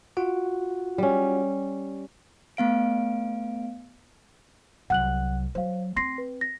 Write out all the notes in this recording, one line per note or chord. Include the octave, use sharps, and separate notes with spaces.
F4 F#4 F#5
G3 C#4
A3 B3 F5 D7
C2 F#3 F#5 F#6 F#7
F#3 C5 F5
C4 C6 A#6 C7
B4
A#6